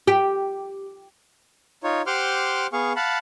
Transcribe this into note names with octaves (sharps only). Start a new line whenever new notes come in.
G4
D#4 F4 C#5
G4 C5 F#5 C6 D6 F6
B3 G#4 F5 C#6
F5 F#5 A5 B5